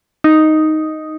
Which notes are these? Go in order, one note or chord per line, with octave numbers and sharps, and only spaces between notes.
D#4